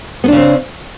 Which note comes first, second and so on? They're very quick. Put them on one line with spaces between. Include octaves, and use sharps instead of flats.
B3 D4 C#3 C4